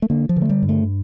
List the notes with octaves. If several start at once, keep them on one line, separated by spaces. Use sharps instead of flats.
A3
D3 A#3
F3
D3
A3
G3
G2
A3